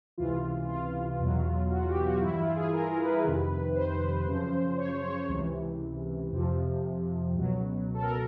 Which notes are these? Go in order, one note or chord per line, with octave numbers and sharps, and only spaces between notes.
C#2 C3 E3 F4
F4
E2 B2 F#3
F#4
G4
F#4
G2 E3 E4
F4
G#4
A#4
B4
F2 C3 D#3
C5
F#2 C#3 F3
C#5
C#5
C#2 C3 E3
F2 C3 F3
C#2 B2 F#3
A4
A#4